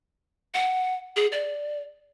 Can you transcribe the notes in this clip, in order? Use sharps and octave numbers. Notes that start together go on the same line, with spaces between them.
F#5
G#4
D5